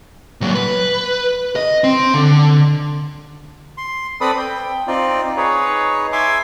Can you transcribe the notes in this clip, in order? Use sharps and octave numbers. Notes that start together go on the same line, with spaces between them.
A#2 F#3
B4
D#5
C4
D3
C6
C4 A4 B4 D5 B5 D#6
G5
C4 D#4 F4 D5
D#4 G#4 B4 C#5
E5 G#5 C6 D6